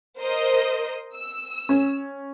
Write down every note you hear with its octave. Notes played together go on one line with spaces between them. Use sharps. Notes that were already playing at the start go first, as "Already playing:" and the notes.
A#4 C5 D#5
E6
C#4